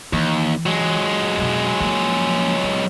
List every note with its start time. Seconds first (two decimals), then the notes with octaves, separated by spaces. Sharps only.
0.13 D#2 E3
0.66 F#3 G#3
1.37 F2 B2
1.80 F3 A#3
2.64 B3